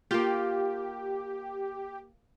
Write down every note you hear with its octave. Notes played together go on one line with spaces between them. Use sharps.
A#3 F4 G4